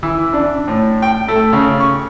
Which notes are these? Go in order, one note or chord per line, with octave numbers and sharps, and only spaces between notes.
E3
D4
A2
G5
A3
C#3
C#6